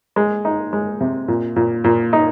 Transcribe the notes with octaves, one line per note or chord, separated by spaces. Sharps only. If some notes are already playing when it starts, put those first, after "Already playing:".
G#3
D#4
G#3
C3
A#2
A#2
A#2
D#4